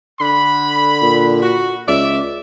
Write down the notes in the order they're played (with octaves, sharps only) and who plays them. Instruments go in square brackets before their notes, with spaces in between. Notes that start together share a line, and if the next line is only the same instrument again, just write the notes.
[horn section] D3 B5
[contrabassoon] A#2
[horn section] F#4
[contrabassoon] C#2 [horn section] D5 E5